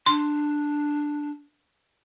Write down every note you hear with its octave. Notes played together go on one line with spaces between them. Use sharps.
D4 C6